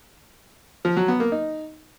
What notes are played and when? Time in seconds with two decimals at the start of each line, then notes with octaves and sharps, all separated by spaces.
0.85 F3
0.96 F#3
1.08 B3
1.20 A#3
1.32 D#4